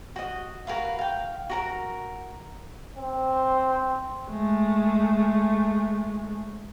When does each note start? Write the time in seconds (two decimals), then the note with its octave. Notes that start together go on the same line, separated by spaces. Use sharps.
0.16 F#4 D#5
0.67 F#4 A#4 B4 F5
0.99 F5 G5
1.50 F#4 A#4 A#5
2.97 C4
4.28 G#3 A3